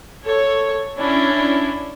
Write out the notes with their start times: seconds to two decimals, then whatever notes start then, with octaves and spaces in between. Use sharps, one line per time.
0.24 A4 C#5
0.97 C#4 D4 E4